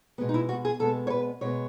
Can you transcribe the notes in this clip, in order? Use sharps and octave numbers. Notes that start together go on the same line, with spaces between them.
B2 G#3 B3
D#4
E4
F#4
G#4
B2 G#3 B3 A4
C#5
B4
B2 G#3 B3 C#5